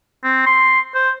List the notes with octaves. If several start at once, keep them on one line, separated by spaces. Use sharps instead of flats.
C4
C6
C5